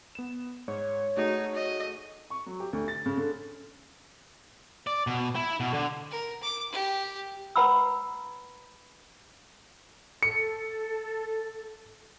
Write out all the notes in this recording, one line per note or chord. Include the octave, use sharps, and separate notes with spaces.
B3 E7
G#2 C#5
A3 D#4 F#4 G#4
D#5
C#6
F#3
G4
D2
A6
C#3
D3
D5
B2
E4
B2
D3
A#4
D6
G4
B4 F#5 A#5 B5 E6
A4 C#7